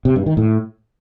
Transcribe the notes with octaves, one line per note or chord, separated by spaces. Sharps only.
C3
G2
D#3
A2